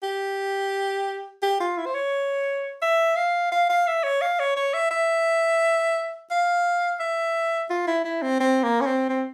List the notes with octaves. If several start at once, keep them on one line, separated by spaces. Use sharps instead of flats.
G4
G4
F4
E4
C5
C#5
E5
F5
F5
F5
E5
C#5
F5
C#5
C#5
E5
E5
F5
E5
F4
E4
E4
C4
C4
A#3
C#4
C4
C4